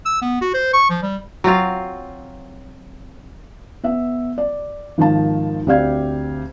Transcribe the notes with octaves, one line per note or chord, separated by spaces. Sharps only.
E6
B3
F#4
C5
C#6
F3
G3
F#3 C4 F4 F5
B3 E5
D5
G#1 D#3 F3 A5
D2 C4 G4 D5 F5 G#6